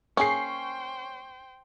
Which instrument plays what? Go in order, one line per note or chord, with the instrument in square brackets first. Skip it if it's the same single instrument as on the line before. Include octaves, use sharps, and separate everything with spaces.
[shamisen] A#3 G#4 [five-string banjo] C#4 [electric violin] C5 G5 [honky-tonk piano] C#6 C7